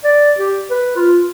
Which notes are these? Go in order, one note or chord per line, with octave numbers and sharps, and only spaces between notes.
D5
G4
B4
F4